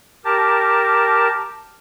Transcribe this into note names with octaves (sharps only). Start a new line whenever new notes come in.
G4 A#4 A5